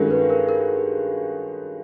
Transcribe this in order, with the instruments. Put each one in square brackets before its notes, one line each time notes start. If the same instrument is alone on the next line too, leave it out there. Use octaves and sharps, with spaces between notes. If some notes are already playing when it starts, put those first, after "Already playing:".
Already playing: [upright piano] G2 D#3 G#3 C#4 F#4 [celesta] A4 A#4
[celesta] B4
A#4
A#4